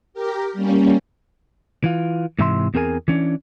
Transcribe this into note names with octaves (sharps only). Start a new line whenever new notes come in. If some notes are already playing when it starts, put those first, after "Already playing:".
G4 A#4
G3 A#3 C#4
E3 F4
G#2 C3 E3 E5 A#5 C6
E2 C4 G#4 A#4 G#5
E3 C#4 D4